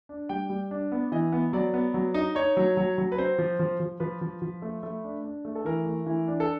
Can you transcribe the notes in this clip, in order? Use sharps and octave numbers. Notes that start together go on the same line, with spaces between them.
D4
G3 G5
G3
D4
B3
E3 D#5
B3
F#3 D5
B3
F#3
D#4
D#4 C#5
F#3
F#3
F#3
B4
C4 C5
F3
F3
F3
F3 B4
F3
F3
A3
A3
D4
D4
A3
A4
E3 A#4
A3
E3
D4
A4